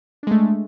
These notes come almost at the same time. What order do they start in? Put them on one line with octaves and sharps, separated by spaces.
D4 G#3 A3